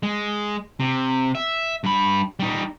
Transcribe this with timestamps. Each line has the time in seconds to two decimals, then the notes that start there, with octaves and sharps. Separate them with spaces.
0.03 G#3
0.80 C3
1.35 E5
1.84 G2 B5
2.40 G3 D#4